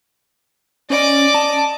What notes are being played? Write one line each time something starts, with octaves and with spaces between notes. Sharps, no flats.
C#4 D5 D#5 D6
A5